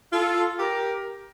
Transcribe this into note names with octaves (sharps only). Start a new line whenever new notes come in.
F4 A4
G4 A#4